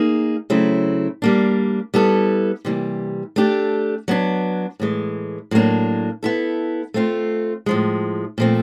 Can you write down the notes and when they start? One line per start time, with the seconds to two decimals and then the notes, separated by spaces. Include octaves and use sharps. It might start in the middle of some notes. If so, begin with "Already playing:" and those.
Already playing: A#3 D#4 G#4
0.50 C#3 F#3 A3 C4 E4
1.22 G3 A#3 D4
1.94 G3 B3 E4 A4
2.65 C3 E3 G3 A#3
3.36 A3 D4 G4
4.08 F#3 B3 D4
4.80 A2 E3 G#3
5.51 A2 F#3 A#3 D4
6.23 B3 E4 A4
6.94 A3 C4 F4
7.66 A2 F3 G#3
8.38 A#2 F3 A3 C4